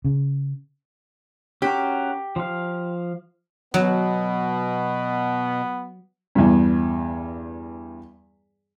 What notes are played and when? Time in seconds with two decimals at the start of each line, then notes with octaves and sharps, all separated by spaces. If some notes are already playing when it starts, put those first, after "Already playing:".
0.05 C#3
1.62 C#4 F#4 G4 A#4
2.36 F3 F5
3.74 B2 F#3 B3
6.35 E2 G2